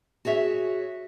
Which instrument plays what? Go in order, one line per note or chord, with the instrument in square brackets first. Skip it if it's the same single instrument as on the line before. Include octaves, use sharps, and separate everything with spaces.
[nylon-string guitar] F#4 G#4 C#5 E5